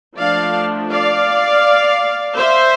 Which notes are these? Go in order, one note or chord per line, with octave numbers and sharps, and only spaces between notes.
F3 A3 D4 D5 F5
D5 F5
C5 E5